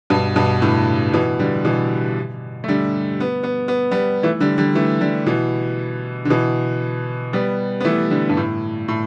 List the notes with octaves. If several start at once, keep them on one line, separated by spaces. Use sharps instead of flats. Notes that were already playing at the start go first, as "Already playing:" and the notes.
G2 B2
G2 B2
A2 D3
B2 E3
D3 G3
B2 E3
A3
D3 G3
B3
B3
B3
G3 B3
E3 A3
D3 G3
D3 G3
E3 A3
D3 G3
B2 E3
D3
B2 E3
G3 B3
B3
E3 A3
D3 G3
G2
A2
A2